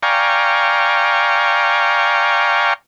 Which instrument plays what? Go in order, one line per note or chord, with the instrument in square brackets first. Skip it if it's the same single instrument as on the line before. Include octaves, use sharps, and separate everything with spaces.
[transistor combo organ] D5 F5 G5 G#5 A#5 C#6